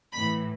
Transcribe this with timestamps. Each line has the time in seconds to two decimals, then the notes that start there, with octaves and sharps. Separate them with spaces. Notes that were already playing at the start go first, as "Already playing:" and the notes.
0.13 A2 E3 B5